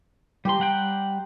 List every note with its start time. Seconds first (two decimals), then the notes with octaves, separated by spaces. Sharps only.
0.45 G3 G4 C5 A#5 C6
0.60 G3 F#5 G5